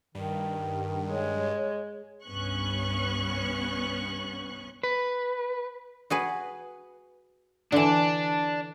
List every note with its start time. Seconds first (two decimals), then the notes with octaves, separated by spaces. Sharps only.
0.15 G2 D#3
1.10 G#3 C#5
2.25 C2 G2 B3 C#4 C#6 F#6
4.83 B4
6.10 F#4 G#4 B4
7.72 D3 E3 D4